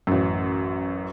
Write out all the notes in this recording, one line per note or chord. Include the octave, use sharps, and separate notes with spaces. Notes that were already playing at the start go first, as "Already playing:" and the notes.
A1 F#2